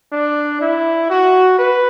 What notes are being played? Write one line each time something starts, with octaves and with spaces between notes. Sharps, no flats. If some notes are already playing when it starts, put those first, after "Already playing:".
D4
E4
F#4
B4